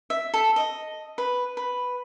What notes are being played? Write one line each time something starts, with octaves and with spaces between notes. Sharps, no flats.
E5
A4
D#5
B4
B4